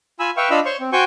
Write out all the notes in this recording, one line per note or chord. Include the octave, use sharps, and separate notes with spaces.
F4 G#5 B5 E6
B4 E5 F5 G5 C#6
D4 F4 D#5 F5 B5 E6
C5 C#5 C6 C#6
C4
F#4 C5 G5 G#5 C#6 G6